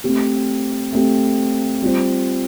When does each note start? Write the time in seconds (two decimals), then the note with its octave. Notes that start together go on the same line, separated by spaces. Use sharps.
0.04 A3 C4 G4
0.92 A3 C4 G4
1.82 G3 C4 F4 C5